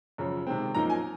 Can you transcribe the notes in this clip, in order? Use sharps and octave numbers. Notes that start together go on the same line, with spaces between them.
F#2 C#3 F3
C3 D#3 G#3 C4
F#2 F3 A#3 D#4 A#5
G#5